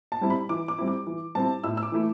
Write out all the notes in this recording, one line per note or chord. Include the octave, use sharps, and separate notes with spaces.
A5
G3 C4 E4
B5
E3 D6
D6
G3 C4 E4
D6
E3
G3 C4 E4 A5
A2 E6
E6
D6
E3 A3 E4